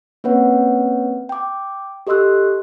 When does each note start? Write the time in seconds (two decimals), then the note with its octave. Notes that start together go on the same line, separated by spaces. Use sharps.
0.24 A#3 C4 C#4 B4 C#5 F#5
1.29 G5 D6
2.07 G4 A4 D#5 C6 E6 F#6